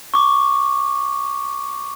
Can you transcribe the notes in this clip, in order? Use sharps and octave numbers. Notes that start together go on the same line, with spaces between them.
C#6 D6